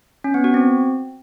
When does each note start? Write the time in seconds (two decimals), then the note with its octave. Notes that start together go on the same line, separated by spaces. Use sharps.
0.24 C#4
0.34 B3
0.44 F#4
0.54 C4